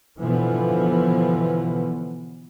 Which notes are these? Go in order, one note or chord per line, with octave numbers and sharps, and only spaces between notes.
B2 D3 E3 F3 B3